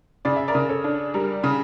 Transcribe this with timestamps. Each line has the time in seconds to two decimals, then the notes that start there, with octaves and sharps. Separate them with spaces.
0.25 C#3 D5
0.36 E5
0.48 A#4 D5
0.55 C#3
0.69 A4 C#5
0.84 D4
1.14 G3 A#4
1.44 C#3